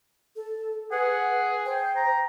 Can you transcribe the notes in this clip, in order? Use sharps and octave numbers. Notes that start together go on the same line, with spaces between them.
A4
G#4 B4 F#5
C5 G5
A#5